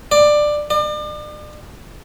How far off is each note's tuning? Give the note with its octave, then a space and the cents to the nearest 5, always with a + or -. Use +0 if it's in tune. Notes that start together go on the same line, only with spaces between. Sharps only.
D5 +15
D5 +40